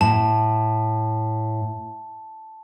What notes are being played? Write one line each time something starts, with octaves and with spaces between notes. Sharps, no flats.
A2 A5